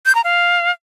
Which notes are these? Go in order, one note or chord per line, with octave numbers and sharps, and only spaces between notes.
G6
A#5
F5